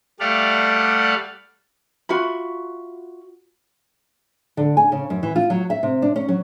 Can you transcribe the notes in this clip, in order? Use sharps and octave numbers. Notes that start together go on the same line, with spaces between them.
G3 A3 D5 F5 F#5
F4 F#4 E5 B5
D3
G#5
C#3
F#2
E3
F4
F#3
E5
C3
D4
C#4
F#3